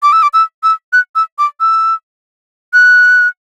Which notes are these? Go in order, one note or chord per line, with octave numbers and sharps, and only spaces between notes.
D6
E6
D6
E6
E6
F#6
E6
D6
E6
F#6